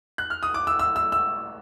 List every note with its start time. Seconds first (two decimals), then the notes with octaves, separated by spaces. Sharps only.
0.18 F#6
0.30 F6
0.43 D#6
0.54 D6
0.67 E6
0.79 E6
0.96 E6
1.12 E6